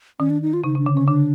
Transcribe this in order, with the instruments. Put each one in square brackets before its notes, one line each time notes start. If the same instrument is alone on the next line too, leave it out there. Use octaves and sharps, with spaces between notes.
[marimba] D#3 [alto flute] C#4
[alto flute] D4
D#4
F4
[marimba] C#3 [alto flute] D#4
[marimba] C#3
[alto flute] D4
[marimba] D3
[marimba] C#3 [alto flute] C#4
[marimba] D3 [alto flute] D4